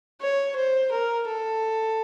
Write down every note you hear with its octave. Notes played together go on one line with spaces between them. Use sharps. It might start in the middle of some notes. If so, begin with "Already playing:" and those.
C#5
C5
A#4
A4